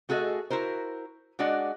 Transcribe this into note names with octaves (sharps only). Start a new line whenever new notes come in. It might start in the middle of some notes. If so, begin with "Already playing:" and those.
A3 F#4 G#4 A4 D#5 E5
E4 F#4 A#4 C5
G#3 D4 F#4 D5 D#5 F#5